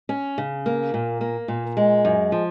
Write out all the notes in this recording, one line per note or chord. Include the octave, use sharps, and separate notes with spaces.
C#4
C#3
A#3
A#2
A#3
A#2
G#3
F#2
F3